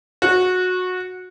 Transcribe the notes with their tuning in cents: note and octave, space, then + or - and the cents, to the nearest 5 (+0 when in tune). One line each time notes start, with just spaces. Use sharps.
F#4 -20